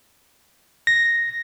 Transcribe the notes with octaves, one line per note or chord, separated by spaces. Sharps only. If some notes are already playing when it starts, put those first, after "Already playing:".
A#6